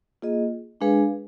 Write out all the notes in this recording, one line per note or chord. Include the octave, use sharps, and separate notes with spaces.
A#3 F4 G#4 D#5
G#3 D4 G#4 B4 F5